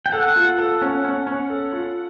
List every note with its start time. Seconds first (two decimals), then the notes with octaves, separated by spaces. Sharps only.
0.06 G5
0.12 A4 F#5
0.36 F4
0.58 A4
0.81 C#4
1.04 C#4
1.27 C#4
1.50 A4
1.72 F4